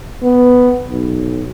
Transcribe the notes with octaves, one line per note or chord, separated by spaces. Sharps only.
B3
B1